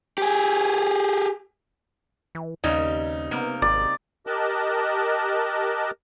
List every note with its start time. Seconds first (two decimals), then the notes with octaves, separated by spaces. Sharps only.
0.18 G4 G#4
2.35 E3
2.64 D#2 C#3 G3 C4 D#4
3.31 C3 A#3 B3
3.62 G#1 D5
4.27 G4 A#4 D#5 A5 F#6